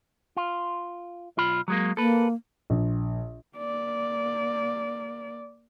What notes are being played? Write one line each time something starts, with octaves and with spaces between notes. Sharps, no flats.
F4
B1 F4 B5
F#3 G#3 A#3
A#3 A4 B4
A#1
A#3 D5